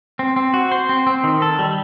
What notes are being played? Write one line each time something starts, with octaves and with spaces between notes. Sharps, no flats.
C4
C4
F#4
C5
C4
C4
D#3
A4
G3